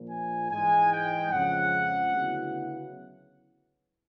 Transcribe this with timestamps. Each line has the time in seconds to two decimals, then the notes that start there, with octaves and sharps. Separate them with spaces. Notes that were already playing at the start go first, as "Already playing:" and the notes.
Already playing: A#1 A#2 F3 A#3
0.10 G#5
0.51 G#2 E3 G#3 G#5
0.92 G5
1.32 F2 C#3 F3 G#3 C#4 F#5
2.14 D2 C#3 F#3 B3 E4